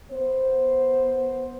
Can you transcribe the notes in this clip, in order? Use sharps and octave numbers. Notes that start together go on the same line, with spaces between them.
B3 C5